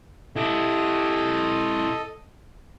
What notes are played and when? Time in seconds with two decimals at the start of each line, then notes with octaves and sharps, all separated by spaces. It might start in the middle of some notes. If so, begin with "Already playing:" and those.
0.36 E4 G4 A4 D#5